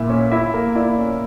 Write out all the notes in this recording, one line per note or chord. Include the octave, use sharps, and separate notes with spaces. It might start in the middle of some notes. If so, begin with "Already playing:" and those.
Already playing: A#2 E4 E5
C#4
E4 E5
A#3
E4 D5
C#4